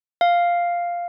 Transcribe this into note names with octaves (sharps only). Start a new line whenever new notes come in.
F5